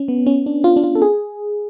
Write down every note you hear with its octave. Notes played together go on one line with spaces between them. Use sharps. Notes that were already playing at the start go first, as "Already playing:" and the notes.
Already playing: C#4
B3
C#4
D4
F4
D4
F4
A4
G#4